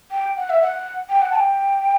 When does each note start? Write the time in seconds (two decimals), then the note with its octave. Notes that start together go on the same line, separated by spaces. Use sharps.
0.11 G5
0.37 F#5
0.50 E5
0.62 F#5
1.09 G5
1.22 F#5
1.31 A5
1.36 G5